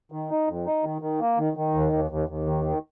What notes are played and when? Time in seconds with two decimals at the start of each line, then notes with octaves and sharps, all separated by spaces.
0.12 D#3
0.30 D#4
0.48 F2
0.66 D#4
0.84 D#3
1.02 D#3
1.20 A#3
1.38 D#3
1.57 D#3
1.74 D#2
1.92 D#2
2.11 D#2
2.29 D#2
2.47 D#3
2.65 D#3